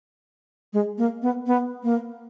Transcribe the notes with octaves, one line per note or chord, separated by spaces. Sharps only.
G#3
A#3
B3
B3
A#3